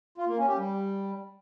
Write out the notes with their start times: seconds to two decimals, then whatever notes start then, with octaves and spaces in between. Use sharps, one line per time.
0.18 F4
0.28 A#3
0.38 C#4
0.48 G4
0.58 G3